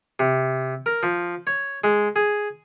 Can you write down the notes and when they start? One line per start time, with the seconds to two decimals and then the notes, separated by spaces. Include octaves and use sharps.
0.19 C3
0.86 A#4
1.03 F3
1.47 C#5
1.84 G#3
2.16 G#4